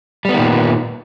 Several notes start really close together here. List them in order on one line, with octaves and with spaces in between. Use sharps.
G3 B3 D#3 A#2